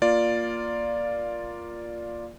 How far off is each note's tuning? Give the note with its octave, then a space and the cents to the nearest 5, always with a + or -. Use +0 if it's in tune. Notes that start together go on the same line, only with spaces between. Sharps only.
A#3 +10 F4 +0 D5 +0